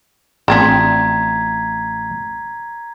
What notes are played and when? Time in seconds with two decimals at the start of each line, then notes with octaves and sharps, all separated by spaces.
0.48 A1 F3 C4 D4 A#5 G#6 B6